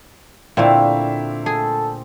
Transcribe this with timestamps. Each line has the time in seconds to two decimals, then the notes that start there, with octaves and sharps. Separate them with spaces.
0.57 A#2 D3 A3 A#3 C4 E4 E5 F5
1.46 G#4 A4